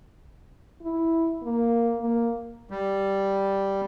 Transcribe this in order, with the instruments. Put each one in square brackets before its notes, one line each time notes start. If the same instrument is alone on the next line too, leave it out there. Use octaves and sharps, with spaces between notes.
[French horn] E4
A#3
A#3
[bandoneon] G3